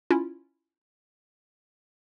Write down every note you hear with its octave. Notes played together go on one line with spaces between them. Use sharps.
C#4 E4 F4